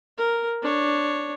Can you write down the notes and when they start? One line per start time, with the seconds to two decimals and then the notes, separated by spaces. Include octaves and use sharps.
0.18 A#4
0.62 D4 C#5